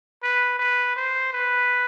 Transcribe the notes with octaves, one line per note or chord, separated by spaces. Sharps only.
B4
B4
C5
B4